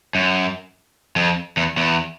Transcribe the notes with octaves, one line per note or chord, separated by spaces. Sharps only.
F#2
F2
E2
E2